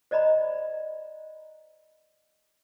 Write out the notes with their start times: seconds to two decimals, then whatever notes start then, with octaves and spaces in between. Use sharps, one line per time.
0.11 C5 D5 D#5 A#5 B5